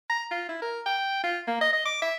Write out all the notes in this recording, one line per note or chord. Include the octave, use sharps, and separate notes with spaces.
A#5
F4
E4
A#4
G5
F4
A#3
D#5
D#5
D6
E5